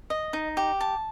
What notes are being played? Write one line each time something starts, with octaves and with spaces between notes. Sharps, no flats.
D#5
D#4
G4
A5